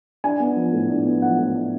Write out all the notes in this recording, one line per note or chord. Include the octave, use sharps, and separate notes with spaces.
D4 G#5
B3
F3
A2
D4
B3
F3 F#5
A2
D4